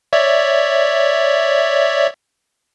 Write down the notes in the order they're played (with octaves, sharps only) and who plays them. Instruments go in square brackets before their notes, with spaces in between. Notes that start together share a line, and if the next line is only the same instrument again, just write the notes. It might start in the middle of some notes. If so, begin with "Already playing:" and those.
[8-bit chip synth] C#5 D5 E5